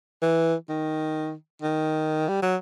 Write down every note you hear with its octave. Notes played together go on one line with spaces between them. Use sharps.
E3
D#3
D#3
G3
F#3